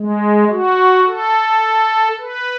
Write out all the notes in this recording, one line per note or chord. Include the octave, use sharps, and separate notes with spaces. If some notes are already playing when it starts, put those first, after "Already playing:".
Already playing: G#3
F#4
A4
B4